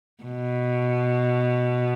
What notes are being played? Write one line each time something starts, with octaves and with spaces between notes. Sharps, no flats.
B2